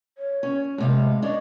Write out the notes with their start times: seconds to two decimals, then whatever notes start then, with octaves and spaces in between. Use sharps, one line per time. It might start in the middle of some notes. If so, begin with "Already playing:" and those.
0.18 C#5
0.43 C#4
0.78 A2 C3 G#3 F5
1.22 D4 C#5 D#5